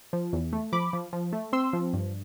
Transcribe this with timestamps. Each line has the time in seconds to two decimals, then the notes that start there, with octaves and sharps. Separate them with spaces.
0.13 F3
0.33 E2
0.53 A3
0.73 F3 B5 D6
0.93 F3
1.13 F3
1.33 A3
1.53 C4 C6 E6
1.73 F3
1.93 G2